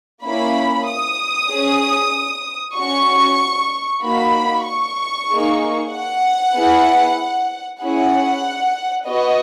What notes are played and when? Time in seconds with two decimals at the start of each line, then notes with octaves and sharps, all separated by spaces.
0.25 A#3 C#4 E4 B5
0.88 D#6
1.51 C#4 G#4
2.76 C#4 F#4 C#6
4.02 A#3 D#4 F#4 B5
4.66 C#6
5.29 A#3 D#4 G#4
5.92 F#5
6.55 B3 E4 G#4
7.81 C#4 E4 G#4 F#5
9.07 B3 F#4 D#5